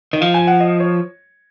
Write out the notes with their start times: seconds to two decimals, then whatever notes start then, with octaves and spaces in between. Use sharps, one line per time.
0.13 D#3 D#5
0.21 F3 F5
0.34 G#5
0.47 F#5
0.60 D#5
0.80 C#5